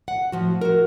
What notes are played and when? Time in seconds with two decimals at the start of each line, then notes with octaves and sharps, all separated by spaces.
0.08 F#5
0.32 A2 F3 F#4
0.61 F#4 A#4